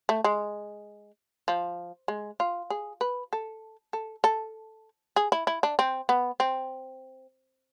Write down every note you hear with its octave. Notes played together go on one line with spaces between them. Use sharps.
A3
G#3
F3
G#3
F4
G#4
B4
A4
A4
A4
G#4
E4
E4
D4
C4
B3
C4